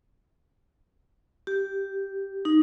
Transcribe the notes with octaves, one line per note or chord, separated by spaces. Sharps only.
G4
D#4